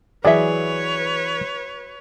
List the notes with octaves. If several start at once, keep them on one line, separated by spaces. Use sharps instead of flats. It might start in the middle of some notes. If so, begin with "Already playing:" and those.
E3 F#3 G#4 B4 C#5 D5 E5